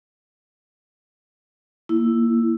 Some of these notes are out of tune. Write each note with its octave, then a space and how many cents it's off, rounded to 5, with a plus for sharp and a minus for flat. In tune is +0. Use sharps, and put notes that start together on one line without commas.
A#3 +0 E4 +0